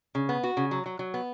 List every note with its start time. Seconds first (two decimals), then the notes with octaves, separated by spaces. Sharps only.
0.15 C#3
0.29 B3
0.43 F#4
0.57 C#3
0.71 F#3
0.86 F#3
0.99 F#3
1.14 B3